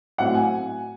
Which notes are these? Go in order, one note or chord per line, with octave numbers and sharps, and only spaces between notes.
A2 F#3 C4 F#5
G#5